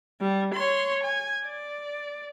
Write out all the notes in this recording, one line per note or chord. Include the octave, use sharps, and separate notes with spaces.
G3
C#5 C6
G#5
D5